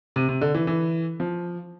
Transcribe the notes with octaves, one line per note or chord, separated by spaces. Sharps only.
C3
C3
D3
E3
E3
F3